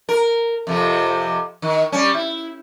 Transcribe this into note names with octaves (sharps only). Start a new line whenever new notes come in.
A#4
F2 C3 F3
D#3
G3 C#4
E4